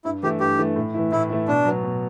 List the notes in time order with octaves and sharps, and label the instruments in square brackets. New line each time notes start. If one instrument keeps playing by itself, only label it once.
[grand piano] G2 [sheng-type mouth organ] E4
[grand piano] E3 A3 E4 [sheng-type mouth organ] G4
[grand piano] G2 [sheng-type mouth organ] G4
[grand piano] E3 A3 E4
A2
E3 A3 E4
[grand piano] A2 [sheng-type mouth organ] E4
[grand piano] E3 A3 E4
[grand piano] B2 [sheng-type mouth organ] D4
[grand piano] F#3 B3
B2